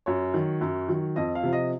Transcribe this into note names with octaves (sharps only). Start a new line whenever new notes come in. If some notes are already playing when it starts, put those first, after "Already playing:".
F#2 C#5
D#3 F#3
F#2
D#3 F#3
F2 D#5
F5
C3 F3
D#5